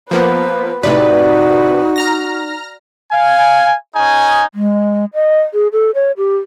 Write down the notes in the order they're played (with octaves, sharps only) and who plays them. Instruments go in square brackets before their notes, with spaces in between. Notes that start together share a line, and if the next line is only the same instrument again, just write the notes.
[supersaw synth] F3 A#3 B3 [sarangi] B4 [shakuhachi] C5
[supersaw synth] A2 C3 B4 [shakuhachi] D#4 [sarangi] F#4 [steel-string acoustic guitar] D5
[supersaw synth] A#5 F6 A#6
[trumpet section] F5 G#5
C#4 D#4 G#4 G#5
[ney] G#3
D#5
G#4
A4
C#5
G4